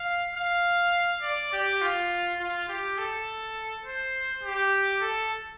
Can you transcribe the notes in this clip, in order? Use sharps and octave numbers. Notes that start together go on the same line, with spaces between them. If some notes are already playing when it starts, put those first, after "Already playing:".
Already playing: F5
F5
D5
G4
F4
F4
G4
A4
C5
G4
A4